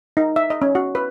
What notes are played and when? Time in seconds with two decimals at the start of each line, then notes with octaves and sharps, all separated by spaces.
0.17 D#4
0.36 E5
0.50 D#5
0.62 C#4
0.75 F#4
0.95 B4